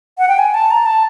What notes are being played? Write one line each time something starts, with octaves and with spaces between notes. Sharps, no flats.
F#5
G5
G#5
A5
A#5
A5